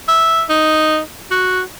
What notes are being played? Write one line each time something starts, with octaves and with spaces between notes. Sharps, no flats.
E5
D#4
F#4